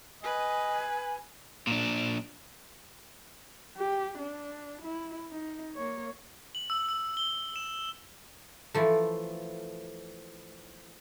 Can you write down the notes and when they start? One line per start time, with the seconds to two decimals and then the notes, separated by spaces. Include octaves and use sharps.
0.24 B4 D#5 G#5
1.67 A#2 D4
3.77 G4
4.18 D4
4.82 E4
5.31 D#4
5.75 A#3 C#5
6.55 F#7
6.70 E6
6.89 E6
7.17 G7
7.56 E7
8.75 E3 F3 A3